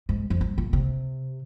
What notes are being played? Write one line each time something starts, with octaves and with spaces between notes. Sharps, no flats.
G#2
F2
G2
A#2
C3